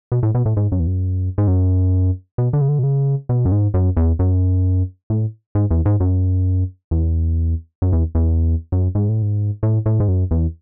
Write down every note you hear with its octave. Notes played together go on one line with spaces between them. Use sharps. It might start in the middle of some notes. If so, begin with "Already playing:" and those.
B2
A2
B2
A2
G#2
F#2
E2
F#2
G#2
F#2
B2
D3
C#3
D3
B2
C#3
B2
F#2
G#2
F#2
E2
F#2
A2
G#2
E2
G#2
F#2
E2
F#2
E2
E2
F#2
G#2
A2
G#2
A2
A2
G#2
F#2
E2